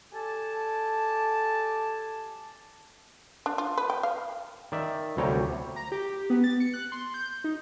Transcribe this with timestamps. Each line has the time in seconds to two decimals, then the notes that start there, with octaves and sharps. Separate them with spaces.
0.12 G4 A4 D5 G#5 A5
3.46 D4
3.58 F4
3.77 B4
3.90 G5
4.03 F5
4.72 D#3 D5 E5
5.17 D2 C3 G3 C#5 G5 A#5
5.76 A#5
5.92 G4
6.30 B3
6.44 A6
6.60 C#7
6.74 F#6
6.92 C6
7.14 G6
7.44 D#4